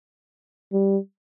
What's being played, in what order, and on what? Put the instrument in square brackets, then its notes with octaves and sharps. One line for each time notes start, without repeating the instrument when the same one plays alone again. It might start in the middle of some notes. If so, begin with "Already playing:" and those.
[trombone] G3